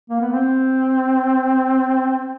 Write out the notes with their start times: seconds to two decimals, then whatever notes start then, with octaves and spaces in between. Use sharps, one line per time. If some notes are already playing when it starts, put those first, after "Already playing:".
0.10 A#3
0.21 B3
0.32 C4